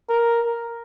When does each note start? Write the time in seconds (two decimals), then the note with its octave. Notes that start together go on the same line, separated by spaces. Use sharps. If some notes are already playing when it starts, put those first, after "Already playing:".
0.09 A#4